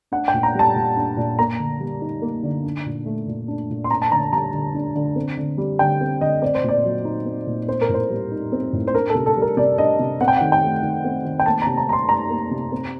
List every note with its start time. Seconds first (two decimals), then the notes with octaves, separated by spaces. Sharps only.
0.12 D4 F#5
0.28 G5
0.34 A#2
0.43 A#5
0.55 G3 A5
0.76 A#2
0.96 D4
1.17 A#2
1.39 A#3 A#5
1.59 D3
1.80 G3
2.02 D#4
2.22 A#3
2.43 D3
2.64 D4
2.86 A#2
3.06 A3
3.27 A#2
3.48 D4
3.70 A#2
3.84 C6
3.91 D4 A#5
4.02 A5
4.11 D3 A#5
4.32 G3 A#5
4.53 D3
4.74 D4
4.95 D3
5.16 C4
5.37 D3
5.58 G3
5.79 D3 G5
6.01 C4
6.21 D3 D#5
6.42 C4 D5
6.55 C5
6.63 A#2
6.69 D5
6.85 F#3
7.05 D#4
7.26 C4
7.47 A#2
7.68 C4 C5
7.81 A#4
7.89 A2
7.94 C5
8.10 G3
8.32 D#4
8.52 C4
8.73 A2
8.87 C5
8.94 D4 A#4
9.09 A4
9.15 C3
9.26 A4
9.37 G3
9.42 A#4
9.57 C3 D5
9.78 D4 D#5
9.99 C3
10.21 C4 F#5
10.28 G5
10.37 D#3 F#5
10.52 G5
10.62 A3
10.83 D#3
11.04 C4
11.25 D#3
11.40 G5
11.46 A#3 A5
11.62 C3 A#5
11.77 A#5
11.89 G3 A#5
11.93 C6
12.09 D#4 A#5
12.30 A#3
12.51 C3
12.72 C4